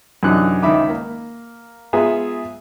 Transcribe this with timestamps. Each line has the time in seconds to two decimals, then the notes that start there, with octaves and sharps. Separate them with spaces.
0.23 F#2 C3 E3 D4 D#4 F#6
0.63 C#2 D#3 D#4 E5 B5 D6
0.90 A#3
1.93 G#3 B3 F4 G#4 E5 A#5